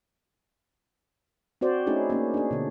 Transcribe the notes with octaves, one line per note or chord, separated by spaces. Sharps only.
C4 F#4 C5 D5
A3 C#4 D#4 E4 G#4
A#3 C#4
D4 G#4
B2 D3